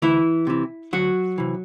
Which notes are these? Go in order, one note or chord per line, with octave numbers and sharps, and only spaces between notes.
D2 E3 E4
C3 E3
D2 F#3 F#4
C3 E3